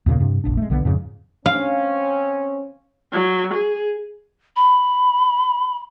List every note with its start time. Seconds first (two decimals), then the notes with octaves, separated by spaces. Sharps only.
0.06 D#2 A#2 C#3 A#3
0.20 G2 C3
0.44 F1 A#1 D4
0.57 G#3 A3
0.70 B1 D3 F#3 B3
0.85 F2 G#2 C#3
1.46 C4 C#4 F5
3.12 F#3
3.54 G#4
4.56 B5